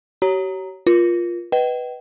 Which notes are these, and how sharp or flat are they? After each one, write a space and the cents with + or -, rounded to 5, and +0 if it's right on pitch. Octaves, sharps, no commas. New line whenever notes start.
G4 -45 C#5 +0 A#5 +0
F4 +0 A#4 +40
B4 +0 D#5 +0 G5 -35